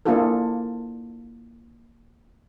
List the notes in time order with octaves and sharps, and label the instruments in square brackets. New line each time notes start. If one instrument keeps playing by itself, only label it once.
[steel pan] A#3 D4 E4 F4 G#4 A4